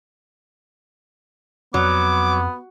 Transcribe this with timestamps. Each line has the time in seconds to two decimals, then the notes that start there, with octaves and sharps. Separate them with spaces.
1.74 F2 F#3 B3 D6